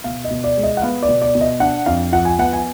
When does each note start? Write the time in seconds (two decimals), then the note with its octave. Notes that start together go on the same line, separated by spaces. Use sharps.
0.04 B2 F5
0.24 D#5
0.30 B2
0.44 D5
0.57 G#3
0.63 D#5
0.77 F#5
0.82 B3 F5
1.03 D5
1.08 B2
1.22 D5
1.35 B2
1.41 D#5
1.60 D4 F#5
1.86 F2 F5
2.12 F3 F#5
2.25 G#5
2.38 B3 F#5
2.53 G#5